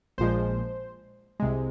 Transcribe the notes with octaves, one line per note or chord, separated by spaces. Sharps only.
A#1 A#2 F3 G#3 C5
C2 C3 G#3